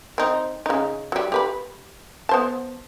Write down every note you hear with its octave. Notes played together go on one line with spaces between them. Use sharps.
C4 D#4
C#3 D#4
F#3 G3
G4 B4 B5
B3 C5 A5